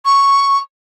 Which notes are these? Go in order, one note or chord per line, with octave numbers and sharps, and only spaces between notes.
C#6